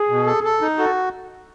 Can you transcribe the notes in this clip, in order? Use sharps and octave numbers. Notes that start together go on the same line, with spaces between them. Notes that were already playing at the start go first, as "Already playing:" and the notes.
Already playing: G#4
B2
A4
A4
D#4
F#4 A4